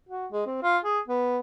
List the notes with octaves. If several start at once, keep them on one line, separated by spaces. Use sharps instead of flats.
F#4
G#3
C4
F4
G#4
B3